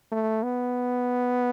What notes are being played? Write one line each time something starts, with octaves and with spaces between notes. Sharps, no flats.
A3
B3